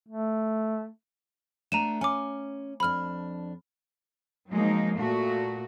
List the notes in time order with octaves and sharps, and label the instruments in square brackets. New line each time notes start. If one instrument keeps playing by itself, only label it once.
[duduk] A3
[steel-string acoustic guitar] A3 B3 D4 [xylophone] A#5 D#7 E7
[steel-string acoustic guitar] C#4 [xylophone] G#5 D6
[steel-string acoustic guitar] F2 D4 [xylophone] B5 F6
[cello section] F3 F#3 G#3 A#3 D#4
A#2 A3 F#4